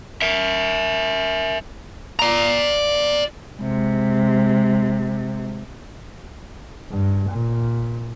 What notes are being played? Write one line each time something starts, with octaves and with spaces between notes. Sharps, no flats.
A#4 E5
D5 A#5
C3 G#3
G2
A#2